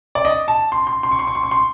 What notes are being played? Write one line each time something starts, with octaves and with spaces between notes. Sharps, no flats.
D5
D#5
A5
C6
C6
C6
C#6
C6
C#6
C6
C#6
C6